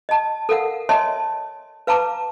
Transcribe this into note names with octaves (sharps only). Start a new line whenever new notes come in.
D#5 A5
A4 A#4 F5 F#5
C#5 D#5 E5 G#5 A5 C6
B4 F5 A5 A#5 D6